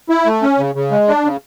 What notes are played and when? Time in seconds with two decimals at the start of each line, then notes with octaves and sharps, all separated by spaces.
0.09 E4
0.26 A3
0.42 C#4
0.58 C#3
0.75 C#3
0.91 G#3
1.08 D4
1.25 C#3